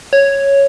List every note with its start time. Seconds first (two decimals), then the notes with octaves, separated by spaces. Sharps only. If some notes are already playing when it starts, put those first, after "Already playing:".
0.13 C#5